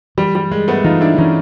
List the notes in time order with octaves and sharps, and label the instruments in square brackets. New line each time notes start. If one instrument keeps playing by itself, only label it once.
[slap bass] E3 [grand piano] G3
[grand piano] G3
[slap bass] G3 [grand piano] G#3
[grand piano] A3 B3
[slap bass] E3 [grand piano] D#4 F4
[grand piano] D4 E4
[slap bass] E3 [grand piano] C#4 D#4